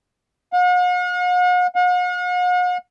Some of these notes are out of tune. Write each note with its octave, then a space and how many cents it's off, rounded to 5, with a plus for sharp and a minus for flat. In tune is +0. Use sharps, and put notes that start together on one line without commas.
F#5 -45
F#5 -45